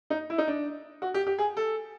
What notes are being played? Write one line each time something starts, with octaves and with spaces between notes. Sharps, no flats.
D#4
E4
D#4
D4
F#4
G4
G4
G#4
A4